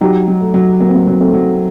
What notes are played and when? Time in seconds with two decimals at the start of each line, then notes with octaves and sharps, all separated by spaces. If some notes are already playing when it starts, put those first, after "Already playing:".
0.01 F#3 D#4 G4
0.28 F#3
0.41 A3
0.54 F#3
0.80 F#3 A#3
0.89 C4
0.95 A#3
1.07 F#3
1.20 A3 C4
1.34 F#3